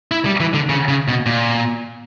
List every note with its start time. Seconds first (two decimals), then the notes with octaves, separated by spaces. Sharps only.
0.11 E4
0.25 G3
0.40 E3
0.54 D3
0.69 C#3
0.88 C#3
1.08 B2
1.26 A#2